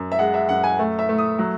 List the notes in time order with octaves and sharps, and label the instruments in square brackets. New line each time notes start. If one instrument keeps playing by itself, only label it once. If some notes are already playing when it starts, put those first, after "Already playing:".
Already playing: [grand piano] F#2
E5
G#3 F#5
E5
F#2 F#5
G#5
A3
E5
A3
D#6
F#3